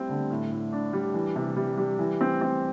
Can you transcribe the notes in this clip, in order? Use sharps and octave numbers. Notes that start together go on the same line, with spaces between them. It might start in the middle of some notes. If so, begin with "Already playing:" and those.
Already playing: G3 C4 E4
D3
A2
A2
D4
G3
E3
C3
G3
G3
E3
C4
C4